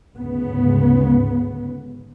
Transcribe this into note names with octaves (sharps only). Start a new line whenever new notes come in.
D2 G#2 C#3 B3